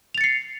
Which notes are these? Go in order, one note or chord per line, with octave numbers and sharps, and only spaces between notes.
A6 C7 C#7 F7